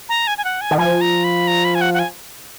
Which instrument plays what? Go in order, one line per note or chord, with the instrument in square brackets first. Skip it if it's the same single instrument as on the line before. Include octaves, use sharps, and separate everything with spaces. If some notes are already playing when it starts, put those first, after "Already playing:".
[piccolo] A#5
G#5
G#5
F#5
G#5
[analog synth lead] D#3
[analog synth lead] F3 [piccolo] G#5
[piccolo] A#5
B5
A#5
B5
G#5
F#5
F#5
G#5